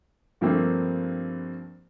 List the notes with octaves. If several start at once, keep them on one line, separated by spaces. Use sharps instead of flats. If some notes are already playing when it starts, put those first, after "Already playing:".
G2 F3 A3 A#3 C4